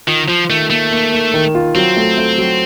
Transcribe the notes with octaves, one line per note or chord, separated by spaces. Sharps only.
D#3 F4
F3 F4
D#3 A3
A3 A#3
A#3
A#3
D#3
F4
F#3 C4
A3
A3
F#3